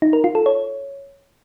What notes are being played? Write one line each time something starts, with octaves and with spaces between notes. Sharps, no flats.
D#4
A#4
F4
A4
C#5